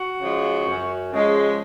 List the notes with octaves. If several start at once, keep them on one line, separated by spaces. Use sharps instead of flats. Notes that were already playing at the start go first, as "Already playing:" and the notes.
Already playing: F#4
C#3 F3 G#3
F#2
C#3 F3 G#3